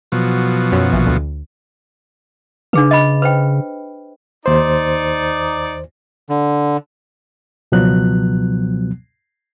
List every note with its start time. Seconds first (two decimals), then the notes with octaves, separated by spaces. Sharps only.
0.12 B2 F3 F#3
0.72 F#2
0.93 A#1 E3
1.07 D2
2.73 C#3 D4 G#4 B4
2.91 D#5 B5
3.22 B4 C5 G5
4.46 D#2 D#4 C5 D5
6.29 D3
7.72 C#2 B2 F3 F#3 B3 F#6